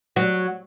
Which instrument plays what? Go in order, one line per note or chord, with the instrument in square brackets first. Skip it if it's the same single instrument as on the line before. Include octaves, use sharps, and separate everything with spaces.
[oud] F#3